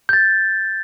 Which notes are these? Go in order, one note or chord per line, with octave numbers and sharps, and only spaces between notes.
G6 A6